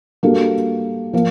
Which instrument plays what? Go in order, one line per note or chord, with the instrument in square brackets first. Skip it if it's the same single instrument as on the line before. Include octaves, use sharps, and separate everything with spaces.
[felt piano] G3 A#3 D4 F#4 A4
F3 A#3